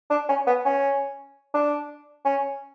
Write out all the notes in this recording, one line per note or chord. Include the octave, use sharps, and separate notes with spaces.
D4
C#4
B3
C#4
D4
C#4